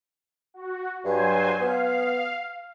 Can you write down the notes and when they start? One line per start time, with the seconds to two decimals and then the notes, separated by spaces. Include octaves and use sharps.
0.54 F#4
1.05 G2 F#3 C5 G#5
1.60 B3 F5